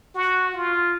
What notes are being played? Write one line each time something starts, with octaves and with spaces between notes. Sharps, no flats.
F#4
F4